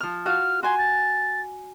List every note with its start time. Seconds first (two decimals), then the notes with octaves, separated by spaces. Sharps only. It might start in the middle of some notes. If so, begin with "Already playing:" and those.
0.01 F3 F6
0.26 F4 F#4 F5 F6
0.63 F#4 G#5 C6
0.78 A6